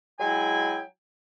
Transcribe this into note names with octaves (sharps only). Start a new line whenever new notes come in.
F#3 G#3 E4 G5 G#5